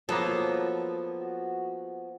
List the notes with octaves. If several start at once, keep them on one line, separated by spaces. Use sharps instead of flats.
F3 F#3 A#3 B3 A4
F#4